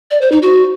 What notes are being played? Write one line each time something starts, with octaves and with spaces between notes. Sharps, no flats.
D5
C5
D#4
F#4